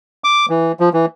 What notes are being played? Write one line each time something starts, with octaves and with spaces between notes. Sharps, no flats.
D6
E3
F3
E3